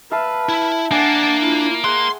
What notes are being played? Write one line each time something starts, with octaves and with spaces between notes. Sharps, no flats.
B4 E5 F5 A5
E4
A#3 D4 F#5 G#5 A5
E4 F4
G#4 F#5 C6